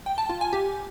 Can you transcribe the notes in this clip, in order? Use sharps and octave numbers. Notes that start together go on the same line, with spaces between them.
G5
A5
F4
G#5
G4